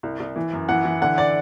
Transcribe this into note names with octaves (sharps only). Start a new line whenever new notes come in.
C2
C2
E3
F#2
E3 F#5
E3
D3 F#5
D5